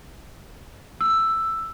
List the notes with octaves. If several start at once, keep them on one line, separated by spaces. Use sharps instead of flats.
E6